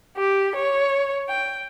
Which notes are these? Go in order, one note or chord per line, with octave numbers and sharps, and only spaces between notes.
G4
C#5
G5